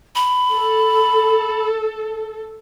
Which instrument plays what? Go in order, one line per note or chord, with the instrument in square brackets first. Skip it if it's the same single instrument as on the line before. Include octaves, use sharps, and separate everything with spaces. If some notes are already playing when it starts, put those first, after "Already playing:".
[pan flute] B5
[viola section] A4